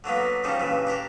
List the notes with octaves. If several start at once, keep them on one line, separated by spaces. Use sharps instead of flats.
D3 F#3 A#3 B3
C#2 C#3 F3 G3 D#4
G2 A#2 C#3 E3
D4 G4 A#4